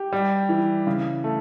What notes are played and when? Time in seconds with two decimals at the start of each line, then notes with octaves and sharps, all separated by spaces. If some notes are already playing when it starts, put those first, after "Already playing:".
Already playing: G4
0.12 G3
0.49 E3
0.87 C#3
1.24 A3